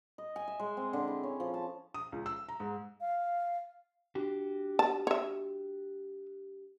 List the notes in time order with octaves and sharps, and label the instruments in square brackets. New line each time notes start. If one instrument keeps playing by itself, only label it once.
[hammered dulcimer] D#5
G#5
E5
G#3
C4
D3
E4
C#4
F3
A5
[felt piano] D#6
C#2
E6
A#5
G#2
[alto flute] F5
[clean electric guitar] D4 F#4 G4
[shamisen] A5
C#5 E5